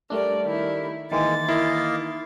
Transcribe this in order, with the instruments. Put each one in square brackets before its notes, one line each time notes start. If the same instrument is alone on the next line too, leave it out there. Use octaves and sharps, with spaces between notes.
[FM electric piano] G3 A3 D4 [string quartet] A#4 D5
[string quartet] D#3 E4
[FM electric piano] D#3 E3 [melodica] G#3 A#3 [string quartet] A6
[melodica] A#3 D#5 F5 [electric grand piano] E4